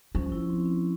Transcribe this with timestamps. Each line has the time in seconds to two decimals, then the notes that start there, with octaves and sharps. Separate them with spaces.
0.15 F3 C#4
0.32 E4
0.49 C4
0.66 C#4